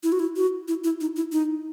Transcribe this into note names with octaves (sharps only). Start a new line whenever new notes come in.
E4
F#4
E4
F#4
E4
E4
D#4
E4
D#4